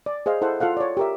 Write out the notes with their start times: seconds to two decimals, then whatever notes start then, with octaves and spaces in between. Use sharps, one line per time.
0.06 D5
0.26 G#4 C5 D#5 F5
0.42 E4 A4 C5 F#5
0.60 F4 A4 F5 F#5
0.77 C#5 D5
0.97 G4 A#4 E5